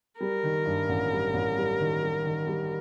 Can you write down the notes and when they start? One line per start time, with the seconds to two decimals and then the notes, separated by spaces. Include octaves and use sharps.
0.20 G3 A#4
0.43 D#3
0.66 G2
0.89 A1
1.12 G3
1.34 A1
1.57 G3
1.80 D#3
2.02 G3
2.24 D#3
2.47 G3